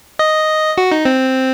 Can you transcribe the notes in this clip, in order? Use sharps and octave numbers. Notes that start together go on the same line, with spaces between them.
D#5
F#4
D#4
C4